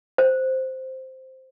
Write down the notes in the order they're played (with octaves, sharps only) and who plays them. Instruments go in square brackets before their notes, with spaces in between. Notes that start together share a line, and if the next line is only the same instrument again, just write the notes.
[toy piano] C5